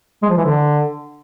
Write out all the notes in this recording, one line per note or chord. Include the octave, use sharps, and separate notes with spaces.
G#3
F3
E3
D3